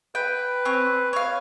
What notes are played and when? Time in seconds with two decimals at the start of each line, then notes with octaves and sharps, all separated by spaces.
0.15 B4 G5
0.65 C4 C#5
1.13 C#5 F5